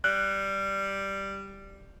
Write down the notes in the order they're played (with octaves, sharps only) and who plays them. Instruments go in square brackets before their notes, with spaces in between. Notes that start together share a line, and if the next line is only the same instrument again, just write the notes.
[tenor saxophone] G3 [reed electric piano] F#6